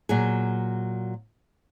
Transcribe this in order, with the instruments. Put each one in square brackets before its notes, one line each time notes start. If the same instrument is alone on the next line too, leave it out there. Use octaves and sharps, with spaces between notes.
[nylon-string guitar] A#2 F#3 G#4